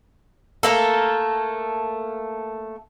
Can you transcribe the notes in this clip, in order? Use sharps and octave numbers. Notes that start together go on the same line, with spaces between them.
A3 A#3 A4